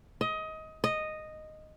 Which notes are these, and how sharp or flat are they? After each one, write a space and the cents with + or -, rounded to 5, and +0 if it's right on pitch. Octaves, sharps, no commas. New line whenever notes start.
D#5 +20
D#5 -5